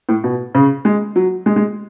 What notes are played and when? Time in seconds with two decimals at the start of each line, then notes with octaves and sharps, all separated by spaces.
0.09 A2
0.24 B2
0.55 C#3
0.85 G#3
1.16 F#3
1.46 G#3
1.56 G#3